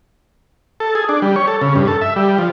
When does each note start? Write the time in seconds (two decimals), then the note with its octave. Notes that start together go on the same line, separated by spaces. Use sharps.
0.80 A4
0.95 G#4
1.09 D4
1.22 G3
1.36 C#5
1.48 A4
1.62 C#3
1.75 G2
1.88 A4
2.01 E5
2.16 G3
2.38 F3